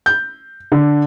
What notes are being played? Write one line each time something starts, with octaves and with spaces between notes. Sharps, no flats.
G6
D3